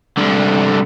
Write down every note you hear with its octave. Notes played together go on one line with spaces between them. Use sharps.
C2 D3